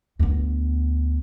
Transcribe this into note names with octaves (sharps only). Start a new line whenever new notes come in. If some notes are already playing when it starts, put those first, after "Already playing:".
D2 B3